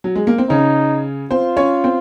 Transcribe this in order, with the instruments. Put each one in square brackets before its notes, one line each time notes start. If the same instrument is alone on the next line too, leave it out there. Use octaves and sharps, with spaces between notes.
[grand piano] F#3
G#3
A#3
C4
[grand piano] C#3 C#4 [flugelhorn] D#4
[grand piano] C4 C5 [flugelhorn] F4
[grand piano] C#4 C#5
C4 C5